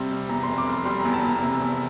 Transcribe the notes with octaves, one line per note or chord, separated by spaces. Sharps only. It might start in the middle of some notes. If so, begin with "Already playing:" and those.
Already playing: C3 G3 C6
G3
E2 A#5
C6
F1
D6
F1
C6
G3 C6
A#5
E2
A5
E2 A#5
C3
E2